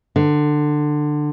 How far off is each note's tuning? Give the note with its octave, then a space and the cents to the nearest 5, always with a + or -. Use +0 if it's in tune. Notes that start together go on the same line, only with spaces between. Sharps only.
D3 +20